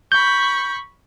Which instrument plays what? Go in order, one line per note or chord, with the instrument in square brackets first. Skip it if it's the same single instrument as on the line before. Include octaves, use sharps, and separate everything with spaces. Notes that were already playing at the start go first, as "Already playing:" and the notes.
[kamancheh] B5 C#6 [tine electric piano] G6